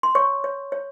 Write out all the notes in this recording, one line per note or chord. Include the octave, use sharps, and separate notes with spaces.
C6
C#5 C#6
C#5
C#5